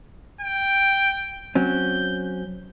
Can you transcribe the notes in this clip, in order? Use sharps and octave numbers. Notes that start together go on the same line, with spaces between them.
G5
F#3 C4 C#4 G6